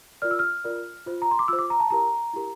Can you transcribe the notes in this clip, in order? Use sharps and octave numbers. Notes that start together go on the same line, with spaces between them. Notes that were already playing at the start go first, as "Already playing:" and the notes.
F4 A#4 D5 F6
E6
F6
F4 A#4 D5
F4 C5
A#5
C6
D6
F4 C5 E6
D6
A#5
A5
E4 G4 A#4 A#5
E4 G4 A#4